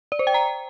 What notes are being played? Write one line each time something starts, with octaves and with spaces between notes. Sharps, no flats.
D5
C5
G5
A#5